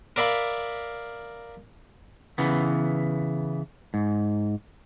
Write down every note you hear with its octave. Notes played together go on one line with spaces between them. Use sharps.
A#4 D5 E5 F5 B5
C#3 E3 B3
G#2